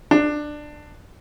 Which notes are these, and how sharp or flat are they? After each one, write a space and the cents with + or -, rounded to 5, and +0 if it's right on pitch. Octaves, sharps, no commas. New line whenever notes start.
D4 +15